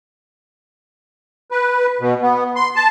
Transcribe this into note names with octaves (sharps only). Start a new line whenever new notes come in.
B4
B2
B3
C6
A5